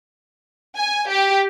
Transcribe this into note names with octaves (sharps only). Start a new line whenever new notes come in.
G#5
G4